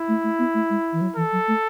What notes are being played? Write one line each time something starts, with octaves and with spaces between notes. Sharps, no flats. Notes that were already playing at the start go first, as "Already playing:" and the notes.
Already playing: E4
A3
A3
B3
A3
G#3
E3
F#3
E3 A4
F#3
A3